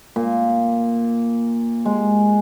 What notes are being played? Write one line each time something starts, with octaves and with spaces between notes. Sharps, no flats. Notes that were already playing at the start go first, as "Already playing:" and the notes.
A#2
G#3